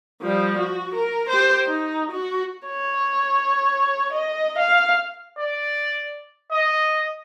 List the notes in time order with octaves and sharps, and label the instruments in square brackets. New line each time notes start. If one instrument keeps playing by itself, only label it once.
[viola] F3 G3
F#4
A#4
G4 C5
D#4
F#4
[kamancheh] C#5
D#5
F5
[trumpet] D5
D#5